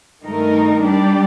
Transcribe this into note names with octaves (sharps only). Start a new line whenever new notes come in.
G2 D#3 A3 D#4 A#4
G3 D4 G4 D5